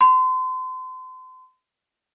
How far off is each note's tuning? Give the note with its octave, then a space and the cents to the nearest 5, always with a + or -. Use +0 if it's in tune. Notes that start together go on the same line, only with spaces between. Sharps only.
C6 -35